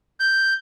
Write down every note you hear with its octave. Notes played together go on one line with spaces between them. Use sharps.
G6